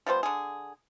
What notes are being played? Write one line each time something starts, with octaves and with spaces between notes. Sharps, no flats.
F3 G3 B3 C5
D3 G#4